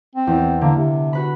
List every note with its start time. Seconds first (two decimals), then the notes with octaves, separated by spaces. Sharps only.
0.15 C4
0.27 E2
0.61 D3 A#3
0.78 C3
1.13 F#4 B4 B5